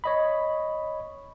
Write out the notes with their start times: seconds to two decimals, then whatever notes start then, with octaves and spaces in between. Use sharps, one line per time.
0.04 C#5 D#5 B5